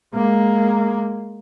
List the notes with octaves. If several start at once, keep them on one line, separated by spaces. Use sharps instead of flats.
G#3 A#3